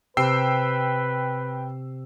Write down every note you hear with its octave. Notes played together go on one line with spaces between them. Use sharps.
C3 B4 G5 E6 C7